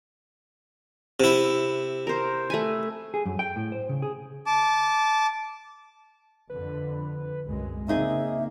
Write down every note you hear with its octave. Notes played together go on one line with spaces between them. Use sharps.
C3 E4
A#4 C5
A3 B4 G#5
G#4
F#2
G5
A2
C5
C#3
G#4
A5 D6
F2 D3 B4
C2 F#2 G#3
C#3 A#3 C4 D#4 G#4 E5